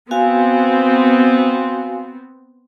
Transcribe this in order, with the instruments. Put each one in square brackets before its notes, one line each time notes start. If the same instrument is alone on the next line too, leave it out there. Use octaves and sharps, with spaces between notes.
[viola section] B3 C4 [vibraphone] F#4 F5 G#5